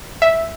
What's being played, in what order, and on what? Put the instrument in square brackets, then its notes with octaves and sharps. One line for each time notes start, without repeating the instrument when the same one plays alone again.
[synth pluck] E5